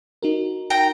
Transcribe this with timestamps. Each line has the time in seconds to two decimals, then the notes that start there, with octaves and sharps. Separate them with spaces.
0.22 D#4 F#4 A#4
0.70 G5 A#5